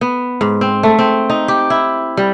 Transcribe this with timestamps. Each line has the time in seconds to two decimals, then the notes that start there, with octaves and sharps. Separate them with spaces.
0.01 B3
0.41 G#2
0.61 C4
0.83 A3
0.99 C4
1.30 D#4
1.48 G4
1.70 E4
2.17 G3